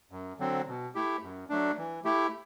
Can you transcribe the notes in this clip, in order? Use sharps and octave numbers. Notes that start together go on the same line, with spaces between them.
F#2
D3 F#3 C4
B2
A3 E4 G4
F#2
F#3 A3 D4
E3
A3 E4 G4